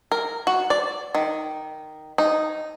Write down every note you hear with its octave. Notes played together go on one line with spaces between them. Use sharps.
A#4
F#4
D5
D#3
D#4